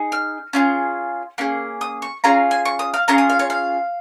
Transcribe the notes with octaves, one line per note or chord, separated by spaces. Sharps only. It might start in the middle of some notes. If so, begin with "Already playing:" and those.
Already playing: D#4 G#4
F6
C#4 F4 G#4
A#3 C#4 G#4
D#6
C#6
C#4 F4 G#4 A#5
G#5
C#6
D#6
F5
C#4 F4 G#4 A#5
D#6
F5
C#5
F5